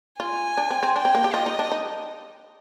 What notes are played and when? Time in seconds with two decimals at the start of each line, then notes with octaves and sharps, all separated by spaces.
0.20 F4 G#5
0.57 D4
0.70 C4
0.83 C4
0.96 D4 G5
1.05 C4
1.15 A#3
1.24 G4
1.33 F4 D#5
1.46 D#4
1.59 D4
1.72 D#4